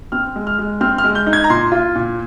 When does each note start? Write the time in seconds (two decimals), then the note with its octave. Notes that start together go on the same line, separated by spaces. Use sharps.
0.12 C4 F6
0.36 G#3
0.47 F6
0.59 G#3
0.81 C4 F6
0.98 F6
1.04 G#3
1.15 G6
1.27 D#4
1.33 G#6
1.44 A#5
1.50 A#2 C6
1.72 F4
1.96 A#2